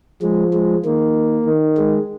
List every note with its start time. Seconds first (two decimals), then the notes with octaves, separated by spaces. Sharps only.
0.22 F3 G#3
0.54 G#3
0.85 D#3 A#3
1.46 D#3
1.77 G#3